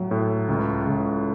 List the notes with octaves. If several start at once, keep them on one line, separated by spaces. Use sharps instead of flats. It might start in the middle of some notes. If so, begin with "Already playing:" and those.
Already playing: A2 F#3
A2
C#2
C#2